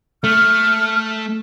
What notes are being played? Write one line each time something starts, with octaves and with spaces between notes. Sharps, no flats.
A3 F6